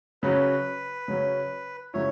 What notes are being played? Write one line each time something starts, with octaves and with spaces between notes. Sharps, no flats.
C#3 F#3 C#4 B4
C#3 F#3 C#4
C#3 F#3 C#4 E4 C#5